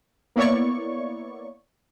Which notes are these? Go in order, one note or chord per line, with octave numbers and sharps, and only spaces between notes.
A#3 B3 E4 C#5 D5 C#6